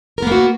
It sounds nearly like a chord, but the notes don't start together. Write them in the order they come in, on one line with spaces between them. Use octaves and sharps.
A#4 B3 A#3 F#4